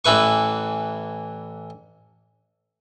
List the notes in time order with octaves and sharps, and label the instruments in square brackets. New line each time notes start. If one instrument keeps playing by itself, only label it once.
[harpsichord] A1 E3 E4 B4 C#6